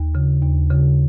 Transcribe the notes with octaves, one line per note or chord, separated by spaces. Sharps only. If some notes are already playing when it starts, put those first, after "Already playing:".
Already playing: D#2
C#3
D#2
C#3